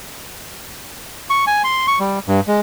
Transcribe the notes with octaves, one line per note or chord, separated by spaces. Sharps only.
C#6
G#5
C6
C#6
G3
G2
G#3